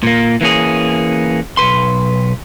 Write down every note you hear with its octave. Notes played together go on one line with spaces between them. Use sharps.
A#2 A#3
E3 A#3 C#4 G#4
B1 G#2 B4 C6